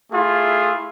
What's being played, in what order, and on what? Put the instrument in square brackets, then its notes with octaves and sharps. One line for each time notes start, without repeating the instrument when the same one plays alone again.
[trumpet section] A3 E4 F4 G#4